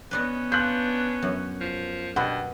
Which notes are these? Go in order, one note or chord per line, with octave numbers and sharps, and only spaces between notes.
B3 C#4 B4 D5 D#5
D4 F4 F#6 G6
F#2
F3
G2 B2 F#5 B5